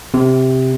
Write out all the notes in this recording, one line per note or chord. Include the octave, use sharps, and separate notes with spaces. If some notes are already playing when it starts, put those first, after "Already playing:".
C3